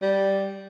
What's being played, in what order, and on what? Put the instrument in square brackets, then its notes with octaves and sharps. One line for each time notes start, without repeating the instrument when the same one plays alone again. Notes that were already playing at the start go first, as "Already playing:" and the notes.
[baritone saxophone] G3